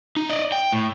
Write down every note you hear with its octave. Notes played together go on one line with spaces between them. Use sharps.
D#4
D5 D#5
G5
A2